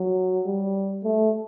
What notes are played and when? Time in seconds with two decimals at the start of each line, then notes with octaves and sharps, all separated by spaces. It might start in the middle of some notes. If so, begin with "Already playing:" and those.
Already playing: F#3
0.46 G3
1.04 A3